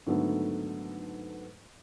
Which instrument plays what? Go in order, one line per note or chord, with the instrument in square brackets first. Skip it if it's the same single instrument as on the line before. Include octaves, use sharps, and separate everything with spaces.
[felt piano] G#2 D3 D#3 F#3 A3 B3